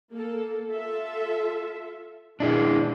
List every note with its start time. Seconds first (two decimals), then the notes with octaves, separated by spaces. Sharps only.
0.13 A#3 A4
0.70 F4 A4 E5
2.40 E3 D4 E4 G#4